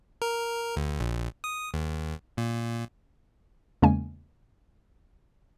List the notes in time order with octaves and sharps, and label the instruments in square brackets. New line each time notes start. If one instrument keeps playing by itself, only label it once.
[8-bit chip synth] A#4
D2
A#1
D#6
D#2
A#2
[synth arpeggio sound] E2 C#3 G#3 A#3 C#4 G#5